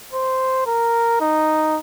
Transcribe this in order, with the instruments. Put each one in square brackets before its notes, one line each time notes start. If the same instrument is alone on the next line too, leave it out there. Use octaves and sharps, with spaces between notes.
[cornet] C5
A#4
D#4